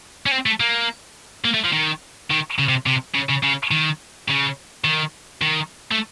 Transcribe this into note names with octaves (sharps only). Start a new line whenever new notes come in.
C#4
C4
A3
A#3
A#3
A3
F3
D#3
D#3
C#3
C3
C3
C#3
C#3
C#3
D#3
C#3
D#3
D#3
A3